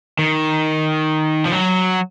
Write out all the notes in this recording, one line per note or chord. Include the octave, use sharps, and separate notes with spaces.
D#3
F3
F#3